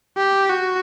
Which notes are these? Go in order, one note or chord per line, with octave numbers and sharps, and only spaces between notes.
G4
F#4